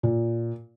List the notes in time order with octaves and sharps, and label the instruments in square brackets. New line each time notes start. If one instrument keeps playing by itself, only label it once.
[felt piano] A#2